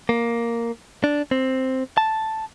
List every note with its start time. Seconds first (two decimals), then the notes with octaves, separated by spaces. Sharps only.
0.09 A#3
1.04 D4
1.31 C4
1.98 A5